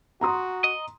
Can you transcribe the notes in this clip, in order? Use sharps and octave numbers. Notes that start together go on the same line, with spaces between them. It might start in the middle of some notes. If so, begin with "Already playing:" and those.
F#4 A#5 C6 D#6
D#5